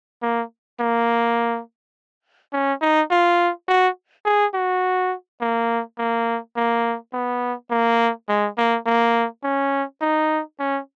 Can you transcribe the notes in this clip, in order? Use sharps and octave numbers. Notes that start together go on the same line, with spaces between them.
A#3
A#3
C#4
D#4
F4
F#4
G#4
F#4
A#3
A#3
A#3
B3
A#3
G#3
A#3
A#3
C#4
D#4
C#4